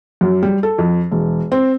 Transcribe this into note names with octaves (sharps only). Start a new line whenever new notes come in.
F#2
G3
A4
F2
E1
C4